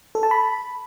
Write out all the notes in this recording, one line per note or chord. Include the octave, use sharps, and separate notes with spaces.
A4
A5
B5